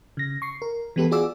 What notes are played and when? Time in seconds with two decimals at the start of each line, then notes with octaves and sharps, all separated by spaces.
0.17 C#3 A#6
0.42 C#6 C7
0.62 A#4
0.96 E3 G#3 B3 G4 A4 B4
1.11 F4 F#4 G#4 D5 D6 E6